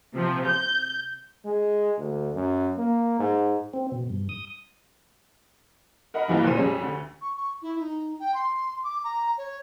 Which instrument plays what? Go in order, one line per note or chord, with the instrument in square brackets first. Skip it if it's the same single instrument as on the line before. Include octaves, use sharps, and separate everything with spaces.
[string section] C3 F3
G6
[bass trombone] G#3
D2
F#2
A#3
G#2
[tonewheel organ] C4
B2
G2
D#6
[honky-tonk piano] A#4 D#5 F#5 B5
G2 E3 F3 A#3
F1 C#2 A#2 F3 C5 D#7
F2 G3 G#3 C#4
D2 D3
[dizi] C#6
C#6
E4
D#4
G5
C6
D6
A#5
C#5